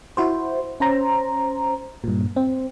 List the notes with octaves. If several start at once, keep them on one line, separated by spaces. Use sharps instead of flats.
E4 F#4 C5
C#4 C5 A#5
G2 A#2
C4